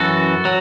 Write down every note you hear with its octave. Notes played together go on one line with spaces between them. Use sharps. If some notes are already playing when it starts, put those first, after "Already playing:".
Already playing: F#2 E3 F#4 A4
F#3